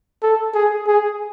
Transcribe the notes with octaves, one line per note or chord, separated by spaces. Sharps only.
A4
G#4
G#4